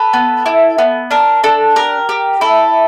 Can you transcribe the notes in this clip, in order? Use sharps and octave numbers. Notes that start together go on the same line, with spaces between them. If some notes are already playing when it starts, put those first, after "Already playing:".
Already playing: A4 B4
B3
E4
B3
D4 A#4
D4 A4
G4 A#4
G4
E4 A4